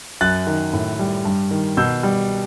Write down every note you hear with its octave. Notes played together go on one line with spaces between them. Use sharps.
F#2 F#6 A6
D#3
A2
G3
G2
D#3
B2 E6 G6
G3